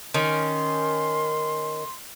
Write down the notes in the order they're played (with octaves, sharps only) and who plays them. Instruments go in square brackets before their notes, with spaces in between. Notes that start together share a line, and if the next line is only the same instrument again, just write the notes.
[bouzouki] D#3 C#4 [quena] C6